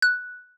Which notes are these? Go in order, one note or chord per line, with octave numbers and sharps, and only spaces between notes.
F#6